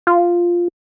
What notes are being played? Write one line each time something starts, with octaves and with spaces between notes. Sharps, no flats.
F4